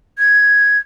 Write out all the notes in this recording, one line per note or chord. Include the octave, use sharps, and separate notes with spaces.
G#6